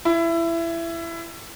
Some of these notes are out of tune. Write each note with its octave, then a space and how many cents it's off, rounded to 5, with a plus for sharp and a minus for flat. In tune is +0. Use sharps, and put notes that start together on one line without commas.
E4 +20